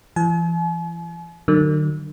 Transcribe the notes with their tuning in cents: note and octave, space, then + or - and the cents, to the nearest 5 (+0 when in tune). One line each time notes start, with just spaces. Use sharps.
E3 +40 G#5 +45
D#3 -45 F#3 +25